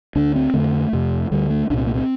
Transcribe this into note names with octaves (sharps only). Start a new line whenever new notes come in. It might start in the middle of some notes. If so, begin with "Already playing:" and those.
D2 D3 D4
C4
F2 D3 A3
F2 C3
D2 D3 G3
A3
C2 A#2 D4
C4
A#3
C4